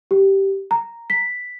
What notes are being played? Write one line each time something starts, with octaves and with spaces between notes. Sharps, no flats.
G4
A#5
B6